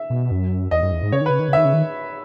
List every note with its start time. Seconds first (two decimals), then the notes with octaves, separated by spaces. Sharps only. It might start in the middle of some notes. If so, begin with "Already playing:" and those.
Already playing: E5
0.10 B2
0.31 F#2
0.71 E2 D#5
0.82 F#2
0.92 E2
1.03 G#2
1.12 C#3 C#5
1.21 D#3
1.26 C#3 B4
1.39 D#3
1.48 C#3
1.53 D#3 E5
1.65 C#3
1.74 D#3